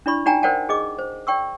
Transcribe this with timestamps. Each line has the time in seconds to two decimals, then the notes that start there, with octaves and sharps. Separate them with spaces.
0.06 D4 E4 D5 B5 C#6
0.26 D#4 F#4 D5 G5 G#5 A#5
0.42 A#4 C5 D5 F#5 G5 A5
0.69 G#4 D#5 D6
0.99 C5
1.27 D5 G5 C#6 E6